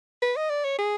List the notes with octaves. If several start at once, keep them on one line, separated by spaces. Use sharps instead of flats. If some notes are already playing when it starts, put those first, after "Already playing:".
B4
D#5
D5
C#5
G#4